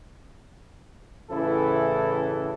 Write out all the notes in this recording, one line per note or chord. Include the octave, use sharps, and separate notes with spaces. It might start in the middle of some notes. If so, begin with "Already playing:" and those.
A1 A2 C#3 E3 E4 A4